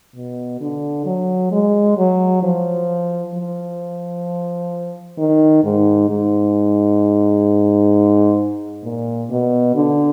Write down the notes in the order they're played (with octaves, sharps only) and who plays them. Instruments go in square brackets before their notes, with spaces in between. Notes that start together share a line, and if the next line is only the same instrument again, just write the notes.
[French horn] B2
D3
F#3
G#3
F#3
F3
F3
D#3
G#2
G#2
A#2
B2
D3